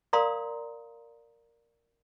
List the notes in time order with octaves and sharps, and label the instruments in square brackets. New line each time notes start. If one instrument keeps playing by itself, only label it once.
[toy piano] A#4 D5 F5 A#5 C6 D#6